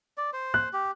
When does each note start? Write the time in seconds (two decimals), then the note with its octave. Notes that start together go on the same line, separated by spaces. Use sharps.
0.17 D5
0.33 C5
0.54 F#6
0.73 G4